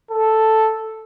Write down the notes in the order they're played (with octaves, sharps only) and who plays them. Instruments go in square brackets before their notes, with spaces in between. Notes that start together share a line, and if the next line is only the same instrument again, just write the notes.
[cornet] A4